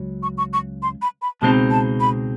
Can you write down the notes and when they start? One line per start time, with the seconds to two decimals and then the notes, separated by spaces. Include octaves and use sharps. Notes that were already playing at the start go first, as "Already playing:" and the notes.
Already playing: C#2 F#3
0.23 C#6
0.38 C#6
0.53 C#6
0.83 C6
1.02 B5
1.22 B5
1.42 C#2 B2 G#3 C4 D#4 A5
1.71 A5
2.00 B5